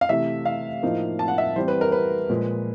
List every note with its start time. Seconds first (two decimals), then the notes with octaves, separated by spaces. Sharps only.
0.01 F5
0.09 C3 E3 A3 E5
0.45 F5
0.83 A2 F3 A#3 D#4
1.19 A5
1.28 F#5
1.38 E5
1.56 E3 G3 C4 E4 C5
1.68 B4
1.81 A#4
1.92 B4
2.29 A#2 F3 G#3